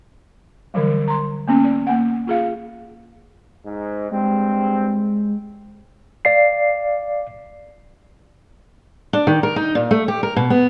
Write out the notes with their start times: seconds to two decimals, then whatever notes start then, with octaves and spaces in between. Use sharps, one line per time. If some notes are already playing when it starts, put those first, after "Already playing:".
0.74 D3 E3 F#3 G3
1.08 A#5 C6
1.48 A#3 B3 C#4
1.64 D5
1.87 A#3 F#5
2.27 F4 G#4 F5
3.64 G#2
4.11 G2 G#3 C4
6.25 D5 F5 C7
9.13 D4
9.27 D#3
9.43 A#4
9.56 D#4
9.75 A#2
9.91 A3
10.08 G4
10.23 A#4
10.36 B2
10.50 B3